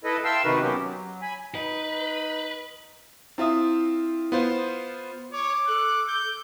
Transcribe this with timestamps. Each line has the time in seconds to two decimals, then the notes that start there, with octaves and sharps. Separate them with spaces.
0.04 E4 A4 B4 D#5
0.24 E5 F5 G5 A5 C6 E6
0.44 C3 D#3 D#4 F#4 A#4 B4
0.61 F#3 A#3 B3 C#4 G4
0.76 F#3
1.22 G#5 B5
1.55 D#4 B4
3.38 C4 E4 F4 E5 D#6
4.32 B3 F4 C5
5.33 C#5 D6
5.68 A4 F#6
6.08 G6